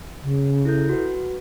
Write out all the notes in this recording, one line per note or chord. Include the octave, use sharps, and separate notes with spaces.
C#3
E4 A4 G6
F#4 B4